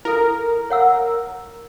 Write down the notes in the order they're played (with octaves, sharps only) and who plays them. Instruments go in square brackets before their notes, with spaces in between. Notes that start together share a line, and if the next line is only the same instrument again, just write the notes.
[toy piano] E4 A4 [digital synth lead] A#4
[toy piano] C#5 F#5 E6